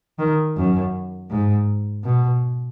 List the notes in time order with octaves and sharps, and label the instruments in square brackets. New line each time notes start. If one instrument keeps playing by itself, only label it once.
[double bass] D#3
F#2
G#2
B2